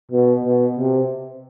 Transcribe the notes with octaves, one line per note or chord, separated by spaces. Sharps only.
B2
B2
C3